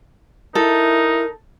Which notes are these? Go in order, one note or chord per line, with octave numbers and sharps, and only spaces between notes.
D#4 E4 A4 A#4